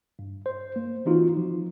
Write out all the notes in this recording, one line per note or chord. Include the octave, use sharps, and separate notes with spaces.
G2
C5
A#3
E3 C4 D#4 F4 F#4
F3